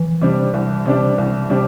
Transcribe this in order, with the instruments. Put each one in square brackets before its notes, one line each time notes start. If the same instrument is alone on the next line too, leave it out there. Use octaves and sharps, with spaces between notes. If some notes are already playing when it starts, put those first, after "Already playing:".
Already playing: [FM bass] E3
[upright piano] C3 G3 D4
C2
C3 G3 D4
C2
C3 G3 D4